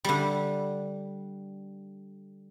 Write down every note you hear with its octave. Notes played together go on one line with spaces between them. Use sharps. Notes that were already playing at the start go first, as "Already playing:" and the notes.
D3 G3